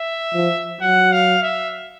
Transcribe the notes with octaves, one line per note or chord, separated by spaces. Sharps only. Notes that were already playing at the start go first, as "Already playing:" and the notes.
Already playing: E5
F3
F#3 F#5
F5
E5